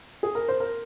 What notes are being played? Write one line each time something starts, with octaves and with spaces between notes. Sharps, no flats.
G#4
A#4
C5
A#4